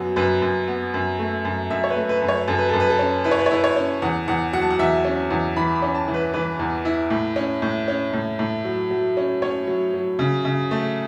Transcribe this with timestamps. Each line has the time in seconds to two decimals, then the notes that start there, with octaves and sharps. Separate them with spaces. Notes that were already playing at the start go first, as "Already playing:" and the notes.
Already playing: F#2 F#3 B3
0.16 F#2 B4
0.42 F#2
0.68 B3
0.94 F#2
1.19 A3
1.45 F#2
1.70 F#2 E5
1.84 C#5
1.90 B4
1.96 A3
2.09 B4
2.22 F#2
2.29 C#5
2.48 F#2 A4
2.58 B4
2.69 F#2 A4
2.80 B4
2.90 A4
2.99 C#4
3.24 E4 B4
3.31 C#5
3.39 B4
3.46 C#5
3.51 E4 B4
3.64 C#5
3.76 C#4
4.02 E2 F#5
4.28 E2 F#5
4.53 F#3 F#5
4.62 A5
4.71 F#5
4.79 E2 E5
5.05 C#4
5.30 E2
5.56 E3 B5
5.75 B5
5.82 C#4
5.95 A5
6.08 E3
6.14 B4
6.34 E3 B4
6.59 E2
6.85 E4
7.10 A2
7.36 C#4
7.62 A2
7.88 C#4
8.13 A2
8.39 A2
8.65 F#3
8.90 F#3
9.17 C#4
9.42 C#4 C#5
9.67 F#3
9.94 F#3
10.19 C#3
10.45 C#3
10.71 A3